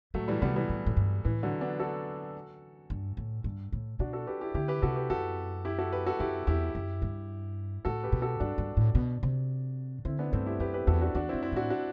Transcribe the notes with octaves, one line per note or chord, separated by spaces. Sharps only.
A2 F#3 A3
E3 G3
C3 G3 B3
E3 G3
A2
A2
G2
A2 E3
D3 F#3
B3 D4
F#4 A4
G2
A2
G2
A2
B2 D4 F#4
F#4 A4
G4 B4
E4 G4
D3 E4 G4
G4 B4
C3 F#4 A4
G4 B4
F#2 F#4 A4
E4 G4
F#4 A4
G4 B4
F#4 A4
F#2 E4 G4
E2 E4 G4
F#2
G2
A2 F#4 A4
G4 B4
B2
F#4 A4
G2 D4 F#4
G2
A2
B2
C3
D3 C4 E4
B3 D4
G2 A3 C4
E4 G4
F#2 G4 B4
G4 B4
E2 F#4 A4
D4 F#4
E2 D4 F#4
F#2 C4 E4
C4 E4
A2 D4 F#4
D4 F#4